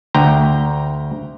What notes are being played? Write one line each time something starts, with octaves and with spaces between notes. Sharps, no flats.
D2 G5 A#5